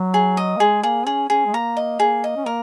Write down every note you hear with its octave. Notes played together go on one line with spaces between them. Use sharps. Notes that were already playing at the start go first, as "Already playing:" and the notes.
Already playing: F#3
G#4
D#5
A#3
G#3 G#4
A#3 G#4
C#4 G#4
C#4 G#4
G#3
A#3 A#5
D#5
A#3 G#4
D#5
C#4
A#3 A#4